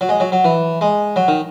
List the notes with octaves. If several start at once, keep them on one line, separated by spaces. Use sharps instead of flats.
F#3
G#3
F#3
F#3
E3
G#3
F#3
D#3